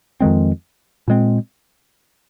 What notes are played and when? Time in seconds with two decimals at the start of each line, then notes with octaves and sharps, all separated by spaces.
0.20 F2 D#3 G#3 C4
1.08 A#2 G#3 C4